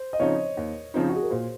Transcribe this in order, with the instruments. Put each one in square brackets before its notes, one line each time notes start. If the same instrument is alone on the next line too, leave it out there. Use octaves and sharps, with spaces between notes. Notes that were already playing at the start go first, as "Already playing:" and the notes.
Already playing: [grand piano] C5
D#5
[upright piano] C#3 F3 C4 D#4 [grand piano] C#5
[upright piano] D#2
C#3 F3 C4 D#4
[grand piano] F#4
G#4
A#4
[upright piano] A#2 [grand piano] C5